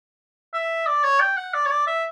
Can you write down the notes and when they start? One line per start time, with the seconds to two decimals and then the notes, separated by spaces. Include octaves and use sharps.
0.54 E5
0.87 D5
1.04 C#5
1.20 G5
1.37 F#5
1.54 D5
1.66 C#5
1.71 D5
1.87 E5